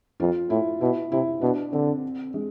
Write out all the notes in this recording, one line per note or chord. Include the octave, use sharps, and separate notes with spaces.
F2 F4
A2 E4
B2 E4
C3 E4
B2 D4
D3 C4
G#3